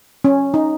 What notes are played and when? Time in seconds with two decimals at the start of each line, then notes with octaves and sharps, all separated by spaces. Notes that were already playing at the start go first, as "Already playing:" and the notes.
0.24 C#4
0.54 D#4